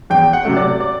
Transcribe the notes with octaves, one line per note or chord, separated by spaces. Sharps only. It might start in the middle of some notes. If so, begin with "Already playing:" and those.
E2 G5
F#5
C3 F#3 A3
D5
D5